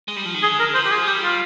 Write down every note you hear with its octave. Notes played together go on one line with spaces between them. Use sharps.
G#3
G3
F3
D#3
D3 G#4
A#4
F3 C5
G4
G#4
G3 G4
F4